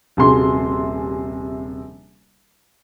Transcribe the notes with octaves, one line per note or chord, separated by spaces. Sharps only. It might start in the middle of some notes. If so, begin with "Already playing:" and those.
D#1 A#1 C3 F#4 G#4 C6